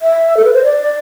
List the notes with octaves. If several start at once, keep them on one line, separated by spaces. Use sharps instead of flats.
E5
A4
B4
C5
D5